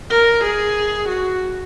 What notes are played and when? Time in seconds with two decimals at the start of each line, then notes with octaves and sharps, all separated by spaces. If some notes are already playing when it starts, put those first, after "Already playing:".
0.10 A#4
0.44 G#4
1.09 F#4